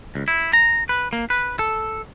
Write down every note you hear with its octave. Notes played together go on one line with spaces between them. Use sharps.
C#2
E4
A#5
B4
A#3
B4
A4